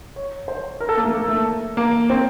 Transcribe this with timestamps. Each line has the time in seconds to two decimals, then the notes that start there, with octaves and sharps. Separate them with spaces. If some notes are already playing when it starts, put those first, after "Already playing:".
0.16 C#5
0.48 C5
0.80 A#4
0.89 A4
0.97 A#3
1.04 A3
1.13 A#3
1.28 A3
1.77 A#3
2.10 C4